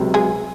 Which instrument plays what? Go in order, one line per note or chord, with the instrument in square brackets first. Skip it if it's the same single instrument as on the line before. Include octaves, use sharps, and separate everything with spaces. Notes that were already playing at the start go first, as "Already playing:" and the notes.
Already playing: [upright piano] C#2 C3 F#3
[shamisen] G#3 G#4